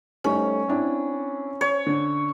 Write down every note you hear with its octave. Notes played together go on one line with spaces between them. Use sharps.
G3 A3 C#4 D#4
C4 D4 E4
C#5
D3